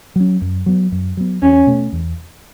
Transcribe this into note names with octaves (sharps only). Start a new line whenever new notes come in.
F#3 C#4
F#2
F#3 B3
F#2
F#3 B3
E2 C#4
B2 A3
E2